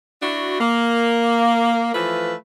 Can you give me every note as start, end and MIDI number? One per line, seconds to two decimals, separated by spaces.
0.22 0.57 62
0.22 0.57 64
0.22 0.57 66
0.59 1.89 58
1.94 2.33 52
1.94 2.33 53
1.94 2.33 57
1.94 2.33 65
1.94 2.33 71